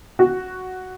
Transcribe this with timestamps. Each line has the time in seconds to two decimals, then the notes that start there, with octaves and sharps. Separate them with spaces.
0.19 F#4